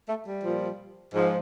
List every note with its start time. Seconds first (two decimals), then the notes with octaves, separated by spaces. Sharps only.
0.09 A3
0.26 G3
0.44 A#2 F3
1.13 G#2 F3